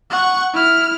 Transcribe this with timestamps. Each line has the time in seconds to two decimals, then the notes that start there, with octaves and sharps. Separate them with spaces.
0.10 F#5 C#6
0.54 E4 F6